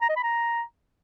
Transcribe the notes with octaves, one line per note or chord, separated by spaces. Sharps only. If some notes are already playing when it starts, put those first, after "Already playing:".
A#5
D#5
B5
A#5